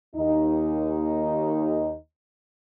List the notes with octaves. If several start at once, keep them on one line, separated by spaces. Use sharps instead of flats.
D#2 D#4